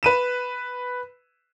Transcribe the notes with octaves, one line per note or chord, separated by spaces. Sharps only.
B4 D#7 E7